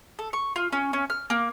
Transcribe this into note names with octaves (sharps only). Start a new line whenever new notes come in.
A4
C#6
F4
C#4
C#4
F6
A#3